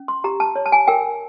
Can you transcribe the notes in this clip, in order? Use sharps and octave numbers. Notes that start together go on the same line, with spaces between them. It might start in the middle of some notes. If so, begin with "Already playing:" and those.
Already playing: C#4
C6
G4 A#5
A5
C#5
A5
G#5
A#4 G5